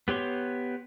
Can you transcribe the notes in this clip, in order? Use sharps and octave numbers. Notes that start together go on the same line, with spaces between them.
B3 G4 C#5 C6